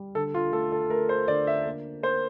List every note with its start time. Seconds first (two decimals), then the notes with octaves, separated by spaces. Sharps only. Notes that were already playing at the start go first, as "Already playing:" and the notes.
Already playing: G3
0.15 D3 A4
0.34 F4
0.52 A3 A4
0.72 A4
0.90 A3 A#4
1.09 C5
1.28 D3 D5
1.47 E5
1.66 A#3
2.03 A#3 C5